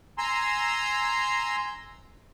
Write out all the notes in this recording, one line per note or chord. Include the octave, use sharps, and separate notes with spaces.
G#5 A#5 C6 E6